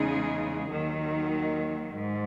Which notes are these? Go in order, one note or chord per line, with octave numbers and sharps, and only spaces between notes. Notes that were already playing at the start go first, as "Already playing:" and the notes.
Already playing: E2 C#3 G#3 D#4 G#4
D#2 D#3 F#3
G#2